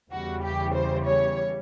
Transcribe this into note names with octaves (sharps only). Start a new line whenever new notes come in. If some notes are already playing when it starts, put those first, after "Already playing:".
E2 C#3 E3 G3 F#4
G4
C5
C#5